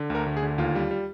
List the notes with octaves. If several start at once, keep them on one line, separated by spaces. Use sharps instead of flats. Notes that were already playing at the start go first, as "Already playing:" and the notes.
Already playing: D3
D2 A#4
D2
G#4
D3
D#2 F4
G3
G3